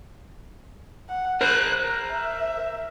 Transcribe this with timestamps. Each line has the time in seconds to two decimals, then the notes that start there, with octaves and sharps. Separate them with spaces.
1.09 F#5
1.41 A#4 C5 F#6
1.84 A#5
2.13 E5